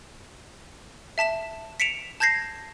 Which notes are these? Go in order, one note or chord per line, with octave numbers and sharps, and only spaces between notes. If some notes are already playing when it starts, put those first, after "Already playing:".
E5 A5 B6 E7
B6 C#7 D7 E7 F7
A5 G6 G#6 A#6 C7